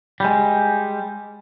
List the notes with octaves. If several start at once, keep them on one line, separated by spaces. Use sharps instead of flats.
G3 G#3